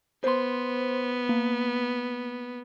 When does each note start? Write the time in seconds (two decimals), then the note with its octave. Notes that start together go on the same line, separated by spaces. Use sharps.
0.24 B3 C5 C6
1.29 A#3